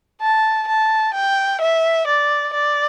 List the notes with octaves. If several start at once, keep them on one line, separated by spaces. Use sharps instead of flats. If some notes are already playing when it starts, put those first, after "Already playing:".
A5
A5
G5
E5
D5
D5